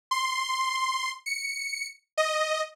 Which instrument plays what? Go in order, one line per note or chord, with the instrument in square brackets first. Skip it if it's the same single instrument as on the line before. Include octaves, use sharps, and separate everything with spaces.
[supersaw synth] C6
C#7
D#5